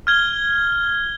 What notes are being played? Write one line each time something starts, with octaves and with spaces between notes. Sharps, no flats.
F6 G#6 G7